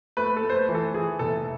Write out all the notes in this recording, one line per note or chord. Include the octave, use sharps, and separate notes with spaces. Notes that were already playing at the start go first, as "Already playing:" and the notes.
A3 B4
A4
A3
C5
B4
E3
A4
E3 G#4
F1 A4